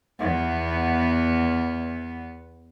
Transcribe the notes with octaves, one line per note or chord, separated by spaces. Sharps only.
E2 B3